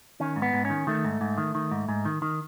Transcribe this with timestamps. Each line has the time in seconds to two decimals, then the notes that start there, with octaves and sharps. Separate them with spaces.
0.20 D#3 C#4
0.36 G#2
0.42 B3
0.54 G#2
0.65 C#4
0.70 D#3
0.87 D#3 A3
1.05 G#2
1.21 G#2
1.38 D#3
1.55 D#3
1.71 G#2
1.89 G#2
2.05 D#3
2.22 D#3